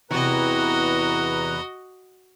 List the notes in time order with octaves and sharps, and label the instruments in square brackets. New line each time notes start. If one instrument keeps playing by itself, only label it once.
[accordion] E2 B4 A#5 [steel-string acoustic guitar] C3 E3 [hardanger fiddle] F#4 D#5